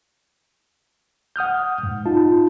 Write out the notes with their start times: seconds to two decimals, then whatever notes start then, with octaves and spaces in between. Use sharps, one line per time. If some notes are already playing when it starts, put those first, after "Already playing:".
1.36 F#5 D#6 F6 G6
1.83 G#2
2.06 D#4 F4 A5